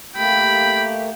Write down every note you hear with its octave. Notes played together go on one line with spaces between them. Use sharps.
A3 A#3 G4 G5 B5